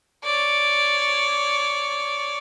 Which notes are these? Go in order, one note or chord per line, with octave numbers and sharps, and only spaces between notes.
C#5 D5